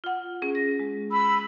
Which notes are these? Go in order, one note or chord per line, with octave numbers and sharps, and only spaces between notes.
F4 F#5
C#4 G#4
A#6
G#3
B5 E6